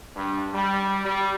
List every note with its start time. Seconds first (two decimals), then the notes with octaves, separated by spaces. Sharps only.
0.16 G2
0.53 G3
1.05 G3